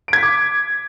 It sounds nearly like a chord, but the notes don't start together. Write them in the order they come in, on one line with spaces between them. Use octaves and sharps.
D7 G#6 B6 D6